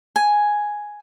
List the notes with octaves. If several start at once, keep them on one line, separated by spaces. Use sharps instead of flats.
G#5